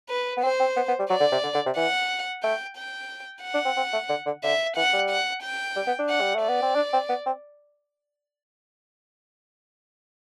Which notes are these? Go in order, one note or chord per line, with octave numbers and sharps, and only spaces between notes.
B4
B3
C4 C5
C4
B3
B3
G3
F#3 D5
D3
C3
D3
D3
C3
E3 F#5
A3 G5
G5
F#5
D4
C4
C4
A3
D3
D3
D3 E5
E3 F#5
G3
F#5
G5
G3
B3
D4
F#5
G3
A3
D5
B3
C4
D4
C4
B3
C4